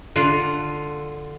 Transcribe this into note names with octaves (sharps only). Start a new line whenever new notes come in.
D3 F4